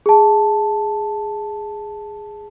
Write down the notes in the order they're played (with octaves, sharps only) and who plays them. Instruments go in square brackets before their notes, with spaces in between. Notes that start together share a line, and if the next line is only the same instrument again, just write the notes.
[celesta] G#4 A5